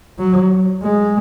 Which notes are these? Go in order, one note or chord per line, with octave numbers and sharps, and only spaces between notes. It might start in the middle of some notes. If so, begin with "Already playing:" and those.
F#3
G#3